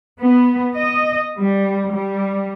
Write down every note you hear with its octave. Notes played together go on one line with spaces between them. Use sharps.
B3
D#5
G3
G3